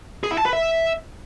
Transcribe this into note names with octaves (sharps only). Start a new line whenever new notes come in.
G#4
E4
A5
B4
E5